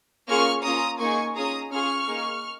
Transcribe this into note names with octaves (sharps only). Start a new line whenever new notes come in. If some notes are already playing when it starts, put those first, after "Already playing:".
A#3 C#4 F4 G#4 C#6 F6
A#3 C#4 F4 A#5 D#6
A#3 D#4 G#4 G#5 C#6
C#4 F4 G#4 A#5 D#6
C#4 F4 G#4 C#6 F6
A#3 D#4 G#4